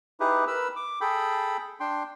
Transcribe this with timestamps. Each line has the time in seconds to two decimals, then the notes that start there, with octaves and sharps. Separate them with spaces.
0.20 D#4 E4 G4 G#4 B4
0.47 A#4 B4 B5 E6
0.76 D6
1.01 G#4 A4 G5 B5
1.80 D4 G5 C6